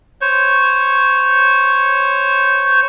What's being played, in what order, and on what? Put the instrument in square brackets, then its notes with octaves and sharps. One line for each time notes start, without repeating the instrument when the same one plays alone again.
[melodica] C5 C#5